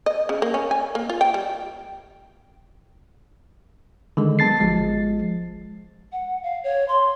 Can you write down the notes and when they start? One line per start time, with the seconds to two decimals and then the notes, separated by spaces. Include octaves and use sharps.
0.06 D#5
0.29 C#3
0.42 A#3
0.54 C#4
0.71 G#5
0.95 A#3
1.10 F4
1.21 G5
1.34 G3
4.17 D3 D#3 G#3
4.39 F#3 B3 A5 A6 C7
4.60 G#1 F3 G#3
6.12 F#5
6.43 F5
6.64 C#5
6.88 C6